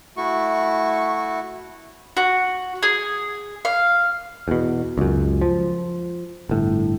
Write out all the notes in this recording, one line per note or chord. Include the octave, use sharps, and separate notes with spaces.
A3 E4 F#4 C#6
F#4
G#4
F5
E2 B2
C#2 F#2
F3
G1 A2